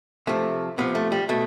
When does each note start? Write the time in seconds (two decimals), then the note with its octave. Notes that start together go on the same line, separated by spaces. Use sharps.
0.27 C3 F3 A3
0.78 C3 F3 B3
0.95 A3
1.12 G3
1.29 B2 A3